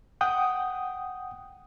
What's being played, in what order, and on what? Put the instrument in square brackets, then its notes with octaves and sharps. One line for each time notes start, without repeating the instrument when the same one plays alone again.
[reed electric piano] F#5 G5 D#6